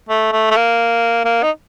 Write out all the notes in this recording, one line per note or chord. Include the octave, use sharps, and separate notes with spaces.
A3
A3
A3
A#3
A#3
D#4